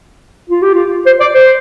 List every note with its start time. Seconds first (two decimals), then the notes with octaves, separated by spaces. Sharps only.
0.50 F4
0.62 G4
0.74 F4
1.06 C5
1.20 D5
1.34 C5